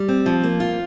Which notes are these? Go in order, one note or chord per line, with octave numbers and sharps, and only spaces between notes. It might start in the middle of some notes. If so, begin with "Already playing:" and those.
Already playing: G3
C4
F3
A#3
F4